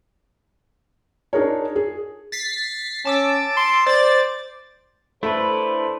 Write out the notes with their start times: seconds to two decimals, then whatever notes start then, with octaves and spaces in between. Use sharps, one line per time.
1.33 D4 D#4 G#4 A#4 C#5
1.76 G#4
2.32 A6 B6 C7
3.05 C#4 A5 D6 E6
3.57 C6
3.86 C5 D5 A6
5.23 A3 D4 E4 A4 B4 C5